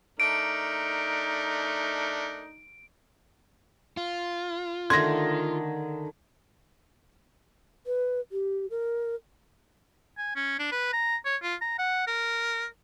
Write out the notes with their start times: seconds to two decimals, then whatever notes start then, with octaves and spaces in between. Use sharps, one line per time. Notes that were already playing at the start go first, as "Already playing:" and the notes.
0.20 A3 D4 D#4 A#4 D7
3.97 F4
4.90 D3 D#3 A3 C6 G#6 A#6
7.86 B4
8.32 G4
8.70 A#4
10.18 G#5
10.36 C#4
10.59 D4
10.72 B4
10.93 A#5
11.26 C#5
11.43 F4
11.61 A#5
11.79 F#5
12.07 A#4